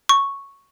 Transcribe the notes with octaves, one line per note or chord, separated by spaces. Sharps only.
C#6